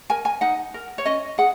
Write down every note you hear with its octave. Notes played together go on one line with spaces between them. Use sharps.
A#4 G#5
G#5
D#4 F#5
A#4
C#5
C#4 D#5
G#4 F#5